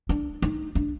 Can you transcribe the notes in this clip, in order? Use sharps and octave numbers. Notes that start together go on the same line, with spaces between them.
D4
D#4
D4